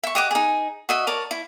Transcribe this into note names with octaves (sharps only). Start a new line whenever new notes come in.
E5 C#6
G4 D#5 F#5 D6
D#4 G#4
F#4 D#5 E5
A#4 C#5 D5 A5
E4